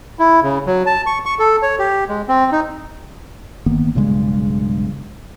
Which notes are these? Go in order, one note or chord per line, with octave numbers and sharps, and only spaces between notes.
E4
C#3
F#3
A5
C#6
C#6
A4
C#5
G4
G#3
C4
D#4
G1 D#3 A#3 B3
B1 G2 C#3 G#3